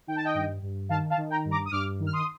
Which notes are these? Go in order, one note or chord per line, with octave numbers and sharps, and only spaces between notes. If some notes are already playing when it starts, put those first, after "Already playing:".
D#3 G5
A5
D#5 G5
G2
G2
D#3 F5 A5
F5 A5
D#3
G5 A#5
G2
A#5 D6
D#6
G2 D6 F6
D#3
F6
C6 D#6